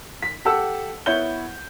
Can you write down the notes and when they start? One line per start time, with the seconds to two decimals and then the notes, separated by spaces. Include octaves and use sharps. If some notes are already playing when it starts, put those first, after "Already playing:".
0.22 B6
0.45 G4 A4 F#5 E6
1.06 B3 E4 C#5 F#5 G6 G7